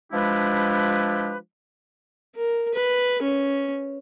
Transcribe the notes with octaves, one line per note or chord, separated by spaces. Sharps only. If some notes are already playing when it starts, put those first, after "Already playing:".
F3 G#3 D4 E4 G4 B4
A#4
B4
C#4